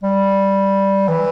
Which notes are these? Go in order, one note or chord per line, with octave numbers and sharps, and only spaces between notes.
G3
E3